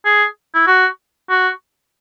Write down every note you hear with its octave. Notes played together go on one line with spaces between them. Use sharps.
G#4
E4
F#4
F#4